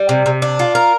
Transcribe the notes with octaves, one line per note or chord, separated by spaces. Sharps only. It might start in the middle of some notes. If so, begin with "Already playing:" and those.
Already playing: G3
C3
C3
D4
F4
A#4